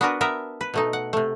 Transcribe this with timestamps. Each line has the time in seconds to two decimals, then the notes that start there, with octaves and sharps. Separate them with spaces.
0.01 B3 D4 F#4 A#4 B4
0.21 B3 A#4 E5
0.61 B4
0.74 B2 A3 D#4
0.93 F#5
1.13 C3 A3